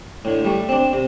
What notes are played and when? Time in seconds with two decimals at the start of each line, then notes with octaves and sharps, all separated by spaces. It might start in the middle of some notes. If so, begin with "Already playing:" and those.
0.25 A2 D3
0.45 G3 A3
0.69 C4 D4
0.93 C3